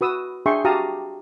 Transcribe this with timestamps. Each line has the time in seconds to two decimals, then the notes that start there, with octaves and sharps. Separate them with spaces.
0.01 F#4 B4 D#6 E6
0.46 D4 G#4 E5 G5 C6 C#6
0.65 F#4 G4 F5 A5 A#5 D#6